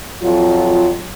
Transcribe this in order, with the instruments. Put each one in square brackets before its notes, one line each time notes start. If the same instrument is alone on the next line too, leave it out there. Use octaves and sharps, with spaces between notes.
[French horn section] F2 F#3 F4